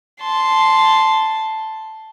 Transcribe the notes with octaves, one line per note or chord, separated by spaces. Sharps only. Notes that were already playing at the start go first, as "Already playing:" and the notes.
A5 C6